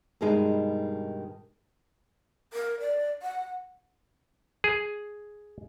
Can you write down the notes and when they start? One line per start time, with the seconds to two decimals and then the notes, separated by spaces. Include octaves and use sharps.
0.21 G2 B2 D#3 G#3 D#4
2.53 A#4
2.80 D5
3.22 F#5
4.64 G#4